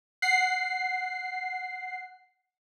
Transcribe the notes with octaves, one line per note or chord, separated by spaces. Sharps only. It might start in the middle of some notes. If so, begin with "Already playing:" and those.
F#5 C7